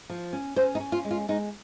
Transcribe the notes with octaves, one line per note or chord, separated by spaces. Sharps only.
F3
C#4
C#4 C5
D#4
C#4
F4
G#3
F4
G#3 D#4